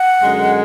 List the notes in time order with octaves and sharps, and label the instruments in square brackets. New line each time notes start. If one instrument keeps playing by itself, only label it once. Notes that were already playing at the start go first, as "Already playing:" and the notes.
Already playing: [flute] F#5
[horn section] F#2 D3 G#3